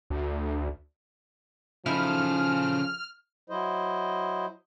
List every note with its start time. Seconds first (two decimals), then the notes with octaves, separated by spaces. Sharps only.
0.10 D2
1.86 C#3 F3 D#4 E4 A4 F6
3.50 F#3 E4 C5 D#5